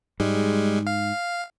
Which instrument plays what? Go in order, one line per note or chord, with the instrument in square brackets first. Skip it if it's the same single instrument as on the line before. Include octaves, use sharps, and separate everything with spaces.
[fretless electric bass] G#2 [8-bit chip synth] G3 G#3
[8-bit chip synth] F5